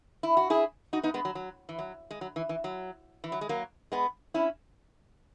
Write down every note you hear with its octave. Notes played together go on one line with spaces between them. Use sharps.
E4
F#4
E4 G#4
D#4 F#4
B3 D#4
G#3 B3
F#3
F#3
E3
F#3
G#3
F#3
E3
E3
F#3
E3
F#3
G#3
F#3 A#3
G#3 B3
C#4 E4